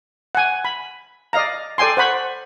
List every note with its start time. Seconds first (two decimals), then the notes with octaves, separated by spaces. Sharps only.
0.35 F#5 G#5
0.65 B5
1.33 D5 D#5 F5 A#5
1.78 A4 D5 G5 G#5 C6
1.97 C5 F#5 B5 C#6